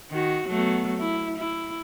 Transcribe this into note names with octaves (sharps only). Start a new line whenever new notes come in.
D#3 F#4
F#3 A3 B3
E4
E4